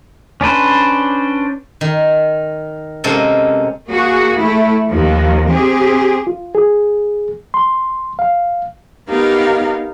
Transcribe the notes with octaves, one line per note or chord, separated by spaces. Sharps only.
C#4 D4 B4 C5
D#3
C3 G#3 A#3 C#4 A4
A#3 F#4 G#4
A3 E4
D#2 D#3 F3
C4 G4 G#4
F4
G#4
C6
F5
B3 D#4 G4 A#4 F5